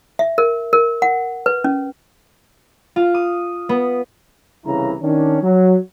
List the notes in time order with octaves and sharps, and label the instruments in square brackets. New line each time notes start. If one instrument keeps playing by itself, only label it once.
[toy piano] E5
A#4
A#4
F#5
B4
C#4
[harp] F4
D#6
B3
[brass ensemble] C2 C#3 E3 E4 A#5
D#3 C#4 D4
F#3